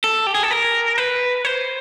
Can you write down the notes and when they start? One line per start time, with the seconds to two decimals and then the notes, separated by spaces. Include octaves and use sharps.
0.04 A4
0.27 G4
0.35 G#4
0.43 A4
0.51 A#4
0.98 B4
1.45 C5